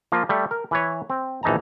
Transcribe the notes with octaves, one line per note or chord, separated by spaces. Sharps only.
F3 A#3 F4
G3 A3
A#4
E3 B4 C#5
C4
A#1 E3 D#4 A5 A#5